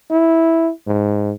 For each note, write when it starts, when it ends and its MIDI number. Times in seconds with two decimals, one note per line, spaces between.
0.11 0.70 64
0.87 1.32 44